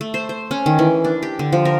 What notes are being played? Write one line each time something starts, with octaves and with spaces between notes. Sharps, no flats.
A3
C5
C5
C#4
D#3
E3
D4
G4
D3
F3
A#4